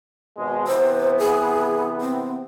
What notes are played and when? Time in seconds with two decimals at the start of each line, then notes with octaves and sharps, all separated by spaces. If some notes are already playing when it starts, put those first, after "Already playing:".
0.37 G#1 B2 G#3
0.67 C3 E3 B3 C5
1.19 G#4
2.01 C4